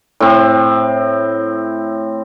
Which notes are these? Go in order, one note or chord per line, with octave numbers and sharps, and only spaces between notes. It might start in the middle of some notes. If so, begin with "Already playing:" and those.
A2 C4